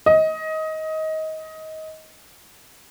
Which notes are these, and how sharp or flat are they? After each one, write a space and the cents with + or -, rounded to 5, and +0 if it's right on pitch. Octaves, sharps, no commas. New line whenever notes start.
D#5 +20